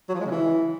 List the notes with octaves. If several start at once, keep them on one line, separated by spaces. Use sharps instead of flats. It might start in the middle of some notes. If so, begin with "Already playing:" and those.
F#3
F3
G#3
C#3
E3